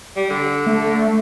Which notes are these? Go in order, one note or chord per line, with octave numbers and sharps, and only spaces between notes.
G3
D3
A3